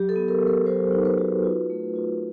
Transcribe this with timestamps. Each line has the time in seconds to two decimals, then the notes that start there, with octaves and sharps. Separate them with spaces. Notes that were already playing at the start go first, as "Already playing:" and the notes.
Already playing: F#3 G4
0.09 A4
0.16 B3
0.28 A#4
0.41 B3
0.47 A#4
0.66 F#3 C5
0.92 D#4
1.05 B4
1.19 F#4
1.44 F4
1.70 A3
1.96 F4